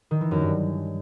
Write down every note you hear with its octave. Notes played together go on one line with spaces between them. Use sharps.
D#3
E3
F#2
G2